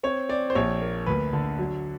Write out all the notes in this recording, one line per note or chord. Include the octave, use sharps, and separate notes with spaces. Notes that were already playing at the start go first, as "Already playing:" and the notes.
C4 C#5
C4 D5
C5
A#1 C#5
A#3
D2 B4
D3
F#3